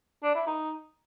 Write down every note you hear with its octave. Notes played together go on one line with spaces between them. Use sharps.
D4
E4
D#4